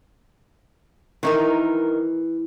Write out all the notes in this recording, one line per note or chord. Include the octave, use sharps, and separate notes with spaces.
D#3 E3 D#4 A#4